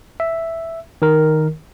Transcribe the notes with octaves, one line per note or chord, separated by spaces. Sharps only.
E5
D#3 A#4